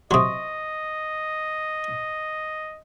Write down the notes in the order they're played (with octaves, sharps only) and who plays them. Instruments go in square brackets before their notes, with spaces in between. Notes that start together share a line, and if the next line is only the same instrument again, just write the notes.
[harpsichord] C3 F#3 [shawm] D#5 [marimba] C6 C#6 D#6